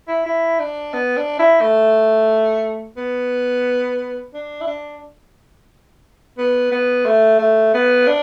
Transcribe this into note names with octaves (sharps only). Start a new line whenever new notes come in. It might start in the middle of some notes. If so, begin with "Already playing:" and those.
E4
E4
D4
B3
D4
E4
A3
B3
D4
E4
D4
B3
B3
A3
A3
B3
D4